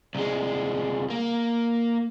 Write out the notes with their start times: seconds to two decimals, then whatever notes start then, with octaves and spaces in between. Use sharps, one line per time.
0.15 C2 G#3
1.10 A#3